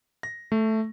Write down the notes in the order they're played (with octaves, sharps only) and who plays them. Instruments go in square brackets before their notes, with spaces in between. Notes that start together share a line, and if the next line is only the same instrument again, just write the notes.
[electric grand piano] A#6
A3